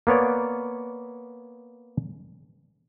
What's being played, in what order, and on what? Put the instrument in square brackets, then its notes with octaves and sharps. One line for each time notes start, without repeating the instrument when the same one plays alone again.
[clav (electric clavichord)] A#3 B3 C#5 D5